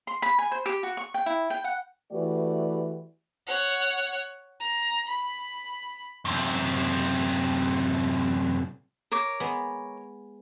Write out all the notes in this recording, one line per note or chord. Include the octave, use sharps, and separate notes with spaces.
C6
B5
G#5
C5
G4
F#4
C#6
G5
E4
G5
F#5
E3 A3 F#4 G4 B4 D5
C#5 F#5
A#5
B5
F#2 C3
A#4 C#5 D6
G#3 B3